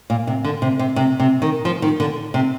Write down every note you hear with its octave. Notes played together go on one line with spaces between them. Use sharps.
A#2
C3
D3
C3
C3
C3
C3
D#3
F3
D#3
D3
C3